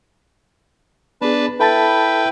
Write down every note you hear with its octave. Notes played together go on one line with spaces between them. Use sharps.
B3 D4 G#4 B4 A5
E4 A4 B4 G5 A5 A6